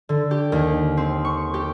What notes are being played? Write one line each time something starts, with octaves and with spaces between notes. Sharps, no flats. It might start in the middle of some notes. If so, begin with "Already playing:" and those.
D3
G4
D#2
C4
C#6
G4